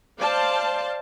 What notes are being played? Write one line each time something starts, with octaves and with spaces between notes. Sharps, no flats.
C5 D5 F5 A5